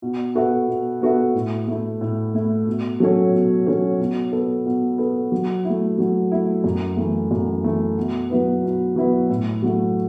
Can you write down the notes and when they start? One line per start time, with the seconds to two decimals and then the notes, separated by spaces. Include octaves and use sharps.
0.02 B2
0.35 B3 F#4 A4 E5
0.68 B2
1.01 B3 F#4 A4 E5
1.34 A2
1.67 A3 E4
2.01 A2
2.34 A3 E4
2.67 B2
3.00 F#3 C#4 A4 C#5
3.33 B2
3.67 F#3 C#4 A4 C#5
4.00 B2
4.32 B3 A4
4.66 B2
4.98 B3 A4
5.32 F#3
5.65 A3 E4
5.98 F#3
6.31 A3 E4
6.64 F#2
6.97 E3 A3
7.31 F#2
7.64 E3 A3
7.97 B2
8.30 F#3 B3 E4 B4
8.63 B2
8.96 F#3 B3 E4 B4
9.30 A2
9.63 F#3 A3